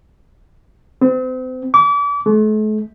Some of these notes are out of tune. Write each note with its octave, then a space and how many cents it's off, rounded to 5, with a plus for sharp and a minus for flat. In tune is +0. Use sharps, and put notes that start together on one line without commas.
C4 -35
D6 -35
A3 -45